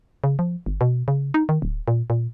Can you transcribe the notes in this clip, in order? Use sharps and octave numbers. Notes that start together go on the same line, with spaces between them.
C#3
F3
G1
B2
C#3
D#4
D#3
D1
A#2
A#2